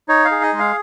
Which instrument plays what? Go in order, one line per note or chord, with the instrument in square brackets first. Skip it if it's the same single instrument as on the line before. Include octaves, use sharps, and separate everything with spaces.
[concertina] D#4 C#5
F5
G#4
D#5
G#3
F5